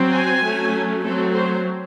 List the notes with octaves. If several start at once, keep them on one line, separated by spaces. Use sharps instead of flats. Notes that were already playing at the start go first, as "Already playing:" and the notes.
Already playing: F#3 C4
G#5
F#3 A3 C#4
F#3 A3 C4 A4
C5